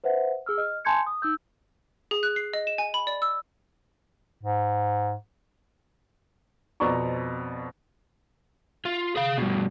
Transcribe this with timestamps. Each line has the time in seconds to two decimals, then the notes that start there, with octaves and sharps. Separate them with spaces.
0.04 B4 C5 E5 F#5
0.46 G#4 E6 F6
0.58 D#5 F6
0.85 G#5 A5 C6 G6 G#6 C#7
1.07 D#6
1.22 D#4 E6 G6
2.11 G#4
2.23 F#6
2.36 C7
2.53 D#5
2.67 E7
2.78 G#5
2.94 B5
3.07 D5
3.22 E6
4.43 G#2
6.80 F2 B2 C4 D5 A#5 C#6
8.85 F4
9.16 G#4 F5
9.38 G2 B2